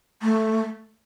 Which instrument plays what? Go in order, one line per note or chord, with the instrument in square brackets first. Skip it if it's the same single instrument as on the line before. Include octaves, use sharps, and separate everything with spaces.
[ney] A3